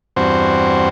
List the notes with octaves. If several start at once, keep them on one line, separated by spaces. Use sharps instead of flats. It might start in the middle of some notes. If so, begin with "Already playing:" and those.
E2 G2 C4 F#4 C5